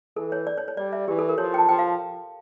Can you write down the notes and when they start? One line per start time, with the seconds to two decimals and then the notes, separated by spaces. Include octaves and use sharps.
0.16 E3 A4
0.32 C#5
0.47 D5
0.58 C#5
0.68 C#5
0.77 G3 D5
0.93 E5
1.08 E3 G4
1.19 A4
1.29 A#4
1.38 F3 C#5
1.54 G5
1.58 A5
1.69 F3 G5
1.79 F5